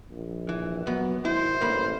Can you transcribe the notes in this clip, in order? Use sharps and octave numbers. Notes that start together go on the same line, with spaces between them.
A#1
E3
F#2 F#3 B3
G#1 E4 C5
A1 G2 A#3 B5